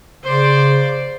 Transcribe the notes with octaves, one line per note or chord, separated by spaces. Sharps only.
C#3 C5 D5